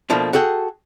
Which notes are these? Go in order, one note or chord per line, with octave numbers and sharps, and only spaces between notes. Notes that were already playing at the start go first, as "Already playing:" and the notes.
B2 F3 A3 A#3 D4
F#4 G#4 A4 G5